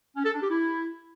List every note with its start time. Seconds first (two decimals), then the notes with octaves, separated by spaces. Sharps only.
0.16 C#4
0.25 A4
0.33 D4
0.42 G4
0.51 E4